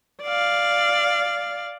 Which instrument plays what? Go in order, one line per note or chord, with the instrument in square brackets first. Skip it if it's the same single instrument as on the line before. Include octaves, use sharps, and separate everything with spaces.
[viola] D5 F5